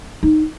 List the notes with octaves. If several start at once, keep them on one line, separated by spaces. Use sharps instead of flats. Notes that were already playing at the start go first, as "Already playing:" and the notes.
D#4